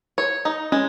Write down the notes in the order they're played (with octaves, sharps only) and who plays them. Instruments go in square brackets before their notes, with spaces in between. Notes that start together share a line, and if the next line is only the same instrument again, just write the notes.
[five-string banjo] C#5
D#4
[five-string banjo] G#3 [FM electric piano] C#4